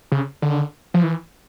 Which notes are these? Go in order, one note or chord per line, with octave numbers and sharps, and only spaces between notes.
C#3
D3
F3
E3